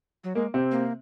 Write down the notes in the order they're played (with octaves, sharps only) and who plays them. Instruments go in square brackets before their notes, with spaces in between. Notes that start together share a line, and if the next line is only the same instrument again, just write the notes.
[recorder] F#3
[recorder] G#3 [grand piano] A#3
[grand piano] C3 C4
[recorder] A#3